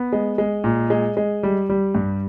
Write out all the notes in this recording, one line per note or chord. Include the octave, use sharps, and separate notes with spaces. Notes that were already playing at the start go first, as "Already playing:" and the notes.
Already playing: B3
G#3
G#3
A#2
G#3
G#3
G3
G3
G2